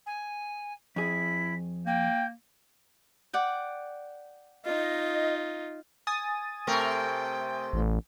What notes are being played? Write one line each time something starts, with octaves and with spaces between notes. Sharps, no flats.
G#5
F2 E4 G#4 B6
A#3 G5 G6
D5 F#5 G5
D#4 F4 D#5
G#5 D#6 A6
C3 A3 A#4 G5
A1